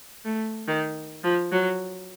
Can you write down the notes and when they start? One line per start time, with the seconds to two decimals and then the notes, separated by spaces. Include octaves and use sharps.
0.25 A3
0.68 D#3
1.24 F3
1.52 F#3